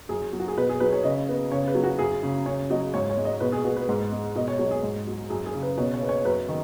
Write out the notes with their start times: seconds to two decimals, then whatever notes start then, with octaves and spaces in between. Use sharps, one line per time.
0.09 F#2 G#4
0.33 F#3
0.40 F#4
0.48 G#4
0.57 B2 B4
0.69 G#4
0.80 F#3 B4
0.92 C#5
1.04 C#3 D#5
1.28 B3
1.51 C#3 C#5
1.68 B4
1.75 F#3
1.83 F#4
1.99 F#2 G#4
2.23 C#3
2.46 C#3 C#5
2.70 F#3 D#5
2.94 G#2 C#5
3.09 C#5
3.17 G#3
3.25 D#5
3.40 B2 B4
3.52 G#4
3.64 B3 F#4
3.76 B4
3.89 G#2
4.12 G#3
4.35 B2 D#5
4.48 C#5
4.59 F#3 C#5
4.71 G#4
4.83 G#2
5.07 F#3
5.30 F#2 G#4
5.46 G#4
5.54 C#3
5.62 B4
5.77 B2 C#5
5.94 C#5
6.02 B3
6.09 C#5
6.25 F#2 B4
6.48 D#3